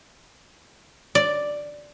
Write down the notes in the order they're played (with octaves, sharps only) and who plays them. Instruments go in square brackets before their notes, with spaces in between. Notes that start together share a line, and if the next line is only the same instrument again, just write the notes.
[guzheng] D5